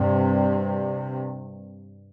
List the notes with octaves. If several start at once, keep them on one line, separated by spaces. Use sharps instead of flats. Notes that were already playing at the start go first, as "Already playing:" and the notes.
Already playing: G2 C3